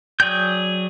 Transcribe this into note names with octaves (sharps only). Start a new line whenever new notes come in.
F#3 G#4 D5 G5 G6